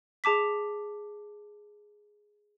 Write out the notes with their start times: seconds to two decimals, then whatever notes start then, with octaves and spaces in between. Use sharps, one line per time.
0.24 G#4 A5 D6 B6